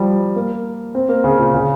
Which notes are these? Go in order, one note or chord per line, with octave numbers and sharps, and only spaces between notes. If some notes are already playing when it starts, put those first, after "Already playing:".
Already playing: F3 G3
A#3
C4
A#3
C#3
A#2
C#3